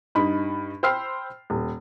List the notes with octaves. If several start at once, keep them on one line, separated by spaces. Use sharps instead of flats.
G2 D#4 B5
C5 G5 B5 E6 F6 C7
D#1